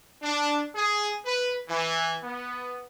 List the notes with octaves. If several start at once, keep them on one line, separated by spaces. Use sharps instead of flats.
D4
G#4
B4
E3
B3